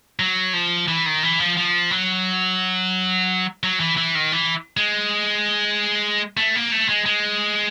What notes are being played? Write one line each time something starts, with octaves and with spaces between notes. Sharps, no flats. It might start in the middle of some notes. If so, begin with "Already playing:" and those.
F#3
F3
E3
D#3
E3
F3
F3
F#3
F#3
E3
E3
D#3
E3
G#3
A3
A#3
A3
G#3
G#3